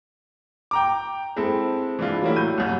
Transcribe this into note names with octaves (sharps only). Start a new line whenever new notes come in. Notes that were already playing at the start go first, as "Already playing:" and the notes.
G5 A#5 D6
G#3 C4 E4 A4
E3 G#3 D4 E4 F4
F#3 G3 A3 A#3 C#4 E4
A2 G6 D#7
C2 F#2